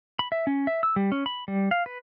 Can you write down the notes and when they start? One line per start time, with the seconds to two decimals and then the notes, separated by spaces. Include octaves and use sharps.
0.19 B5
0.32 E5
0.47 C#4
0.67 E5
0.83 E6
0.96 G3
1.12 C#4
1.26 B5
1.48 G3
1.71 F5
1.86 B4